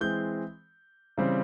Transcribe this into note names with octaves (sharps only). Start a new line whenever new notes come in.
E3 G#3 C4 G6
C#3 E3 G3 C4